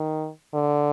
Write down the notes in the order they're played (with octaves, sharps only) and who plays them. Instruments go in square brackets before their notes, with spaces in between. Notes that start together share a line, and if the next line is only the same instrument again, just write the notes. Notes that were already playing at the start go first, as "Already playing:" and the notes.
Already playing: [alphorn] D#3
D3